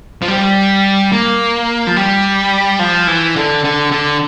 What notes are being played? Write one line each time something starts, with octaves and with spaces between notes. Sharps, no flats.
F3
G3
A#3
F3
G3
F3
E3
D3
D3
D3